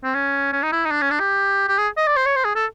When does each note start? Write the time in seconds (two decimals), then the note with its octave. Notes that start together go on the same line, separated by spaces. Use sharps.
0.03 C4
0.15 C#4
0.53 C#4
0.63 D#4
0.72 E4
0.85 D#4
0.91 D4
1.01 C#4
1.11 D4
1.20 G4
1.69 G4
1.78 G#4
1.97 D#5
2.07 D5
2.17 C5
2.26 C#5
2.36 C5
2.45 G#4
2.56 A4